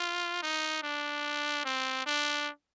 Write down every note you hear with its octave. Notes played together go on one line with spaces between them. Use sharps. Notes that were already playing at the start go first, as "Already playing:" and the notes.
Already playing: F4
D#4
D4
C4
D4